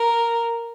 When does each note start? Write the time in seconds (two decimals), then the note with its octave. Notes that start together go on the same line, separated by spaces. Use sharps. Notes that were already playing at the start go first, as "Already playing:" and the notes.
Already playing: A#4